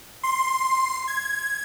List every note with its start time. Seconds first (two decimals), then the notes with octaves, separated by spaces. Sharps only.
0.23 C6
1.08 G#6